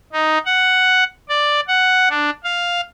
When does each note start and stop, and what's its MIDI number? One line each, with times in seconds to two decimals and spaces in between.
0.13 0.38 63
0.46 1.04 78
1.29 1.60 74
1.68 2.08 78
2.10 2.30 62
2.44 2.81 77